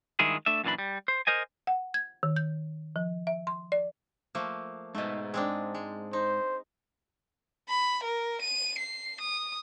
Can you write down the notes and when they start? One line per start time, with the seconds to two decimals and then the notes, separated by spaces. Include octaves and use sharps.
0.19 G2 D#3 G#3 E4 F4 G#4
0.46 A3 D4 E5
0.64 F#2 A#2 E3 D4 B5
0.79 G3
1.08 C5
1.27 A#4 C5 D#5 G#5
1.67 F#5
1.94 G#6
2.23 D#3
2.36 G6
2.96 F3
3.27 E5
3.47 C6
3.72 D5
4.35 F3 A3 A#3
4.95 G#2 B2 A3 D#5
5.34 G#3 C4 D4
5.75 G#3
6.13 D#4 C5
7.69 B5
8.03 A#4
8.41 D#7
8.79 C7
9.21 D#6